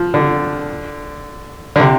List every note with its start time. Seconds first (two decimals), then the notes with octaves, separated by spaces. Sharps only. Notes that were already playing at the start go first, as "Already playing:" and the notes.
Already playing: F3
0.14 D3
1.76 D3
1.80 C3